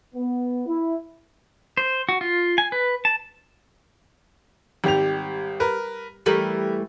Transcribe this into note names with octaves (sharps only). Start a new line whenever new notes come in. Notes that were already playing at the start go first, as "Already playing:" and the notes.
B3
E4
C5
F#4
F4
G#5
B4
A5
G#1 G3 G4 F7
A#4 B4
E3 G3 A3 G4 A#4